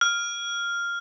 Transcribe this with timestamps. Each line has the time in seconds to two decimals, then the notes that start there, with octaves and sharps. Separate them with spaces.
0.01 F6